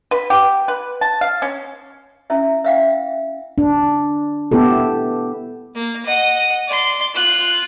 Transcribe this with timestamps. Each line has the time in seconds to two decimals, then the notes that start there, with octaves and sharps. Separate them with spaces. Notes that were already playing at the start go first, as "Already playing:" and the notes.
0.11 B4
0.30 G4
0.68 B4
1.01 A5
1.21 F5
1.42 C#4
2.30 C#4 E4 E5
2.64 E5 F5 G5
3.58 D4
4.51 B3 E4 G4 A4
5.75 A#3
6.05 D#5 F#5
6.68 D5 C6
7.14 F4 F#6